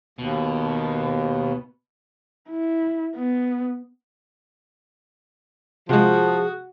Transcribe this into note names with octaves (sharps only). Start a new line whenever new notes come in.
D#2 B2
E4
B3
C3 F3 G#3 F#4 G#4